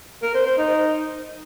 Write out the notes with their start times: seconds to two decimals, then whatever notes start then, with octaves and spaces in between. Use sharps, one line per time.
0.23 A#4
0.34 C5
0.46 C5
0.58 D#4